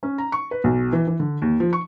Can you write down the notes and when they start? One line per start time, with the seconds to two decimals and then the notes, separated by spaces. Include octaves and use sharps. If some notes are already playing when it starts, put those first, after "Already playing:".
0.03 C#4
0.18 A#5
0.32 C#6
0.51 B4
0.64 B1
0.92 E3
1.07 E3
1.20 D3
1.42 D#2
1.60 F3
1.73 C#6